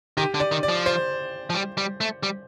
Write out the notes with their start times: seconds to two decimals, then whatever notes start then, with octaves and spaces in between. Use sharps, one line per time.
0.17 D#3 G4
0.34 D3
0.40 D5
0.52 D#3
0.63 D5
0.69 F3
0.86 C5
1.50 F3
1.55 G3
1.77 G3
2.01 A3
2.23 G3